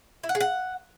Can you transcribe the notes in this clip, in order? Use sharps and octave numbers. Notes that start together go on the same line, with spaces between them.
E4
F#5
G#4
F#5